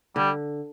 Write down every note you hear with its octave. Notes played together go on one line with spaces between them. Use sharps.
D3 G3